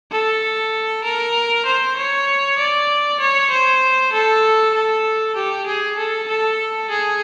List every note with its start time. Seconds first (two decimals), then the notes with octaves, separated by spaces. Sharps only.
0.11 A4
1.04 A#4
1.65 C5
1.96 C#5
2.58 D5
3.19 C#5
3.50 C5
4.12 A4
4.74 A4
5.35 G4
5.66 G#4
5.97 A4
6.28 A4
6.90 G#4